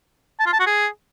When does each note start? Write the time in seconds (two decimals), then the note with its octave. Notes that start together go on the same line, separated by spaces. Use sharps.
0.40 A5
0.46 F4
0.53 A5
0.60 F#4
0.66 G#4